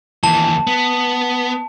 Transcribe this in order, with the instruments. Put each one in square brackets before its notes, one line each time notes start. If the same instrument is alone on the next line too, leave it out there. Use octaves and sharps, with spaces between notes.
[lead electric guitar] D#2 E3 [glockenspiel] A5
[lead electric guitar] B3